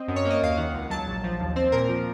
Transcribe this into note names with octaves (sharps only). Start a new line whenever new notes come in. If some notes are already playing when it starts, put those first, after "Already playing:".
Already playing: C4 D#5
F#2
C#5
A#3
D#5
D#2 F5
D#3 F#5
C#2
F#3 A5
A#1
F3
D#2
C4 C5
A#2 A#4
F3